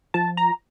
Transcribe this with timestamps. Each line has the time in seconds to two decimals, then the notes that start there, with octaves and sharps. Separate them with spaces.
0.14 F3 A5
0.37 A#5